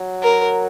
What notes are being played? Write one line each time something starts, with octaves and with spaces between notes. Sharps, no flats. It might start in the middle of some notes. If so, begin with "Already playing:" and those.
Already playing: F#3
A#4